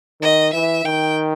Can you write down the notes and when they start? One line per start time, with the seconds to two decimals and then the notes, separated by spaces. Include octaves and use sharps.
0.21 D#3 D#5
0.53 E3 E5
0.84 D#3 G5